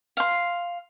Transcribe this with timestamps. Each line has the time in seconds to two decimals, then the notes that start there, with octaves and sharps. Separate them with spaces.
0.17 F5 C6